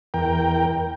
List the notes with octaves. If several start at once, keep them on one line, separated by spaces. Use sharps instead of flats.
E2 A#4 G5